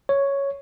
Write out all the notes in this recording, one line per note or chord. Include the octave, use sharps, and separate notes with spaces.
C#5